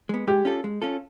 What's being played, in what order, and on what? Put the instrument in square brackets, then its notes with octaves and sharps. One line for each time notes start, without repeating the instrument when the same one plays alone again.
[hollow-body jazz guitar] G#3 B3
[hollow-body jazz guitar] G#3 [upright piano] G4
[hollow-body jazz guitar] C#4 F4 A4
G#3
C#4 F4 A4